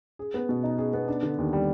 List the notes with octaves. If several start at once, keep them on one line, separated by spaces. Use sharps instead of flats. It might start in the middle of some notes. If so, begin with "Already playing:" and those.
G#4
B3
B2
D#4
G#4
B3
D4
D3
D#2
G3